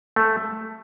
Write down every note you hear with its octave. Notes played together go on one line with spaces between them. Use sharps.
A3